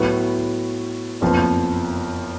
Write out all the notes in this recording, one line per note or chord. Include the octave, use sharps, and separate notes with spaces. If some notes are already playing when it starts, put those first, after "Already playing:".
Already playing: A2 F#3 B3
F#1 F2 F3 B3